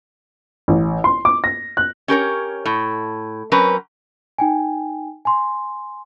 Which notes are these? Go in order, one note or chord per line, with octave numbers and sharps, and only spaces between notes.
A1
C6
D6
A#6
F#6
C#4 G4 A#4 C#5
A2
F#3 C4 C#4 A#4 B4
D#4 G5 G#5
G#5 C6